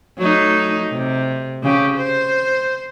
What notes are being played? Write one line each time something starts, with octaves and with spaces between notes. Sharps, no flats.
F#3 A3 D#4
C3
C#3 C#4 G4
C5